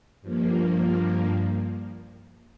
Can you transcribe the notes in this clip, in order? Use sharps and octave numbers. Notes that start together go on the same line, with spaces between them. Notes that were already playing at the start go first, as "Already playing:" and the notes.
G2 F3 A#3